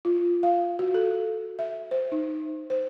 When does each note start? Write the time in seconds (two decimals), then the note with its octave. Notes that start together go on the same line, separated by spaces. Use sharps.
0.05 F4
0.43 F5
0.79 F#4
0.94 A4
1.59 E5
1.91 C5
2.12 D#4
2.70 C5